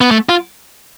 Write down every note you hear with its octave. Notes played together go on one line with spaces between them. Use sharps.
B3
A3
F4